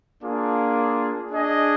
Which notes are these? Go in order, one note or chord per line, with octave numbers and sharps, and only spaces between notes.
A#3 D4 F4 G#4
D4 G#4 D#5